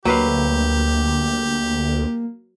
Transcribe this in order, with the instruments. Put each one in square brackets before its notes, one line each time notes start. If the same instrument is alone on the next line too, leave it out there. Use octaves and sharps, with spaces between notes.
[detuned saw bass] D2 [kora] F#3 B4 F5 [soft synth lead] A#3 [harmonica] G4